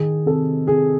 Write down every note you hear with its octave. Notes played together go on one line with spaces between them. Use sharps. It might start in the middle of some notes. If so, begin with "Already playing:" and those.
Already playing: D#3 G#4
C3 A4
C3 G#4